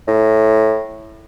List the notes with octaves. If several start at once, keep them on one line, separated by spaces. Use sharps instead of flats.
A2